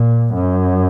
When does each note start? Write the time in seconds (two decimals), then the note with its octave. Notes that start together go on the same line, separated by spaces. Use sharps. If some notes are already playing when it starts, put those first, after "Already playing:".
Already playing: A#2
0.34 F#2